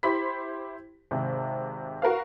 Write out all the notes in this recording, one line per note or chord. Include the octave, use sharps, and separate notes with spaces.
E4 G4 C5 B5 C6 B6
G#1 C3
F#4 A#4 B4 F5